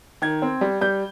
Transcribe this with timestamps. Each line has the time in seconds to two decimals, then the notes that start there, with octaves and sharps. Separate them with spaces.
0.22 D#3 G#6
0.42 C4
0.61 G3
0.81 G3 G6